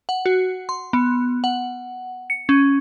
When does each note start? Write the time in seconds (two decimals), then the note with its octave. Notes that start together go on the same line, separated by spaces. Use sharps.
0.09 F#5
0.26 F#4
0.69 C6
0.93 B3
1.44 F#5
2.30 C#7
2.49 C#4